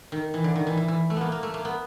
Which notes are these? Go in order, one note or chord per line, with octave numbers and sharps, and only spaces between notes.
D#3
E3
D3
D#3
E3
E3
E3
A3
A#3 B3
A#3
A3
A#3
B3